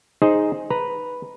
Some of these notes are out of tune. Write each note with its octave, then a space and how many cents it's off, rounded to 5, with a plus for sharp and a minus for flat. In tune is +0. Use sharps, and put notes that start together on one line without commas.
D#4 +0 G#4 +0 C5 +0
B4 +0 A#5 +0